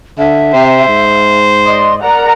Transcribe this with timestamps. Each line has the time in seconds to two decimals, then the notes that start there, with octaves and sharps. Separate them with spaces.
0.18 D3 E5
0.53 C3 C5
0.87 G#2
1.65 D5 D#5 C6
2.02 A#4 D5 F#5 A#5